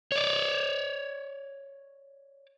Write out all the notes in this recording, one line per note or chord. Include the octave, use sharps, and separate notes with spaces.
C#5 D5